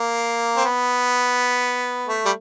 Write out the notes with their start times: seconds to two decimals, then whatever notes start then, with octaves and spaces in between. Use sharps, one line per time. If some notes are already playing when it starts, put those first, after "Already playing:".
Already playing: A#3
0.57 C4
0.65 B3
2.07 A3
2.25 G3